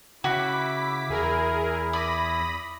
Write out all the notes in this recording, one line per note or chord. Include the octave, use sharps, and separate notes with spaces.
C#3 E4 F#4 D6 B6
E2 G#4 A#4
D5 B5 D#6 A#6